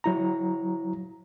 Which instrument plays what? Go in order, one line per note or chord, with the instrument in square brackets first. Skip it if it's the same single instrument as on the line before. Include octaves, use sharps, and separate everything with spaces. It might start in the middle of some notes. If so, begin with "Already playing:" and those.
[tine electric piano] F#3 E4 A#5